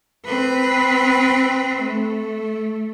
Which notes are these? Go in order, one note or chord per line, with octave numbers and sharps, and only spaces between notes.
C4 B4
A3